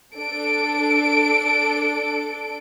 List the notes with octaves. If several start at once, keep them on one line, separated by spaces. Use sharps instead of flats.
D4 A4 D7